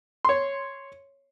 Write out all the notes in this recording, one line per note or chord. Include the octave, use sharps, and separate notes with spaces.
C#5 C6